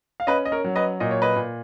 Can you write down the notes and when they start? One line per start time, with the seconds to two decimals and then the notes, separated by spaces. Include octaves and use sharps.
0.20 F5
0.27 C#4 B4 D#5
0.45 D#5
0.52 A#4 C#5
0.64 F#3
0.76 B4 D#5
1.00 A#2 D#5
1.11 C#5
1.22 B4 D#5
1.36 A#2